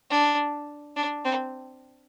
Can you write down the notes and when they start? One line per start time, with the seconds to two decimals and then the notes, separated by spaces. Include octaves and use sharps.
0.10 D4
0.96 D4
1.25 C4